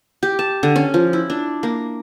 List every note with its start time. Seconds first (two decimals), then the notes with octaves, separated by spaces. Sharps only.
0.23 G4
0.39 A5
0.63 D3
0.76 C#4
0.94 F3
1.13 E4
1.30 D4
1.63 A#3